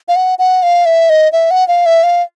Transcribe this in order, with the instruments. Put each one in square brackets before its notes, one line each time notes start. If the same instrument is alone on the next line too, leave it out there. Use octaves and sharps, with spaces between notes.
[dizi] F5
F#5
F#5
F5
E5
D#5
E5
F#5
F5
E5
F5